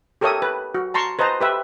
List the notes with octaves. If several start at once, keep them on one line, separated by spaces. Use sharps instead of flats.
G4 A4 A#4 C#5 E5 D#6
B4
F#4
A5 A#5 C6 C#6
B4 C5 D#5 A5 A#5
G4 B4 E5